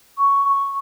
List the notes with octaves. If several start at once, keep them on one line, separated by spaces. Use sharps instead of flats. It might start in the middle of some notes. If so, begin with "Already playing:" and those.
C#6
C#6